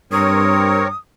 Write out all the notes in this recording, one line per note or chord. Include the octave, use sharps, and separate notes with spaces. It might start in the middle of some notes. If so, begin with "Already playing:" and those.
G2 C4 A#4 C#5 D#6